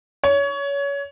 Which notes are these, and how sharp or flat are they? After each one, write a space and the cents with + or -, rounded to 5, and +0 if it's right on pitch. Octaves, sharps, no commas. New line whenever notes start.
C#5 +25